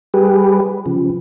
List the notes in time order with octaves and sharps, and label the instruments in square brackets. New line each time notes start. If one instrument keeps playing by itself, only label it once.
[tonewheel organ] G3 G4 G#4 B4
C#3 F3